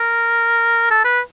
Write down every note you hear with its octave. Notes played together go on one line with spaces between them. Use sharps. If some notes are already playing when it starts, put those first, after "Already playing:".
Already playing: A#4
A4
B4